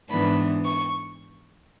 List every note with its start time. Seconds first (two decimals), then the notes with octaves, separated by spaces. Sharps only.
0.10 G#2 E3 B3 D4 B5
0.65 C#6